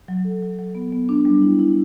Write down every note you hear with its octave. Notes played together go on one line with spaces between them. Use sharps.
F#3
A4
F#3
F#3
B3
B3
D4
G3
E4
E4